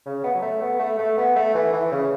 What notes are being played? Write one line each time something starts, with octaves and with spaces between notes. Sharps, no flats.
C#3
B3
F#3
A3
B3
A3
A3
B3
A3
E3
E3
C#3